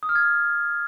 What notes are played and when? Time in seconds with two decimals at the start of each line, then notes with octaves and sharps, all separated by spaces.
0.03 D#6
0.09 F6
0.15 G#6